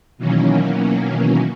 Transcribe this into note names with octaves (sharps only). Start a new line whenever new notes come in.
B2 D#3 E3 F#3 A#3 C#4